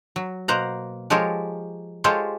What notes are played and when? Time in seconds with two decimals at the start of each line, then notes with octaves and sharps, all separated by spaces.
0.16 F#3
0.48 B2 A#3 C5 F#5 A#5
1.10 F3 G#3 G4 A4 A#4 C#5
2.04 G#3 F4 G4 A4 C5 C#5